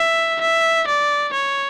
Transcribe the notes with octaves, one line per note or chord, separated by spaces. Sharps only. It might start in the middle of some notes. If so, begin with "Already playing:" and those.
Already playing: E5
E5
D5
C#5